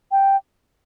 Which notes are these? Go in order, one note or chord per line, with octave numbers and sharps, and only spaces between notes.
G5